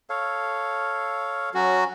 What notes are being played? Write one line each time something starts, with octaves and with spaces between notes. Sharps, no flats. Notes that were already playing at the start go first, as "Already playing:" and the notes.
A4 C#5 F5
F#3 C#4 F#4